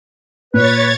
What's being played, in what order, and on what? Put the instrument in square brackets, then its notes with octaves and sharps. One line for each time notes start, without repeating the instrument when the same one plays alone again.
[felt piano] A#2 [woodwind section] B4 [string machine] C#5 G#6 A6